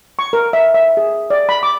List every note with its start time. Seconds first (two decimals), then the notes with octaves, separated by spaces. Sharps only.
0.19 C#6
0.33 A#4
0.53 E5
0.74 E5
0.97 G#4
1.30 D5
1.49 B5
1.63 D6